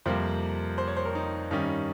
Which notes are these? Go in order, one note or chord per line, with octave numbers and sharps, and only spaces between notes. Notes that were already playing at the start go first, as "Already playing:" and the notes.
F2 C3 G3 A#3 C5
C5
C#5
C5
A#4
D#4
G2 D#3 G3 C#4 D#4